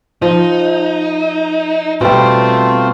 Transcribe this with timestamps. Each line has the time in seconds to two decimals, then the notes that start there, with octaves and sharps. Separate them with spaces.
0.22 F3 D#4
2.01 B2 G3 A3 C4 F4 C6